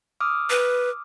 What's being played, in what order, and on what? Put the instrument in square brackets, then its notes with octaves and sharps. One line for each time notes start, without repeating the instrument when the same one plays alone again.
[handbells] D6 D#6 F6
[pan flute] B4